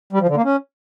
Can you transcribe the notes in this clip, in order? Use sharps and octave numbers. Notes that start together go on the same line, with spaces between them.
G3
F3
D3
A#3
C#4